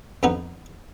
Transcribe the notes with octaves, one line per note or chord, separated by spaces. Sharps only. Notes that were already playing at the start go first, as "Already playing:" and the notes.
F2 B3 D#4